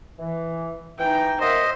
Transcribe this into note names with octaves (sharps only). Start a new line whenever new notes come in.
E3
E3 D#4 G5
D#2 C5 D#5 E5 F#5